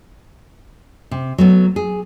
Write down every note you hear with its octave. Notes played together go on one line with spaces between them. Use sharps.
C3
F#3 A3 B3
G#4